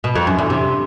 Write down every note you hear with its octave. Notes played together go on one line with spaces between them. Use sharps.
B2
F2
F#2
E2
C3